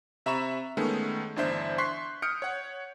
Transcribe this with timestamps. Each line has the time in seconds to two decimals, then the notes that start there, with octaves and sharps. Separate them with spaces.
0.26 C3 E5 A#5 B5 C#6 E7
0.77 D#3 G#3 A3 B3 C#4
1.36 G1 E2 D4 C5 E5 G6
1.78 C6 C#6 F#6 B6 C7
2.22 D#6 F6 G6 C#7 D7
2.42 C#5 F#5